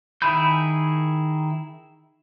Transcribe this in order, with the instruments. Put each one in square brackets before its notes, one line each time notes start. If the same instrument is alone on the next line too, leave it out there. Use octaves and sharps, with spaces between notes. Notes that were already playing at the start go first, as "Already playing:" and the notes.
[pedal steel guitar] D#3 E4 G#4 B5 G6